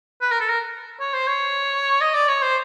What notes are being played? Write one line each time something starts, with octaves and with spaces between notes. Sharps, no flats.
B4
A#4
A4
A#4
C#5
C5
C#5
D#5
D5
C#5
C5